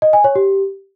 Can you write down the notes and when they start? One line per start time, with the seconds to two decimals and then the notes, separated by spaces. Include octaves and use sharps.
0.02 D#5
0.13 G#5
0.24 C#5
0.36 G4